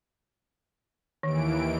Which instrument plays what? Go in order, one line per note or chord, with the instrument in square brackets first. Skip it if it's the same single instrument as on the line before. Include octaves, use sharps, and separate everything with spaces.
[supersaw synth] D#2 E3 D7 [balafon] D#3